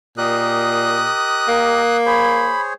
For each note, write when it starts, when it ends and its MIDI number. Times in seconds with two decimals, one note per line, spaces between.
0.18 1.11 46
0.18 1.82 67
0.18 1.82 70
0.18 1.82 75
0.18 1.97 87
0.18 1.97 90
1.48 2.53 58
2.06 2.73 68
2.06 2.73 72
2.06 2.73 73
2.06 2.61 83